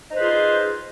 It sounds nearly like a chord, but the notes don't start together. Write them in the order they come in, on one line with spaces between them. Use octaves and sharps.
D#4 C5 B4 G#4 F4